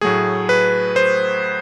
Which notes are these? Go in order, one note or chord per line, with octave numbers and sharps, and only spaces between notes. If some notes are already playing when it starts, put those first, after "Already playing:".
A2 F#3 A3 G#4
B4
C5